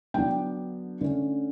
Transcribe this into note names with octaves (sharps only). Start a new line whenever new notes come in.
D3 F#3 B3 D4 G5
D3 A3 C#4